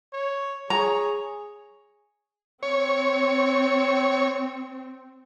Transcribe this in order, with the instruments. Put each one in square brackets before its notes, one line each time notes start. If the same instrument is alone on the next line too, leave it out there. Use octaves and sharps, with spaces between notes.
[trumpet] C#5
[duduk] G#4 [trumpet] C#5 [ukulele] A#5
[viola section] C4 [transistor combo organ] C#5